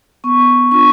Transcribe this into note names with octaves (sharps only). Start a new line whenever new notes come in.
B3 C#6
D4 F4 C#6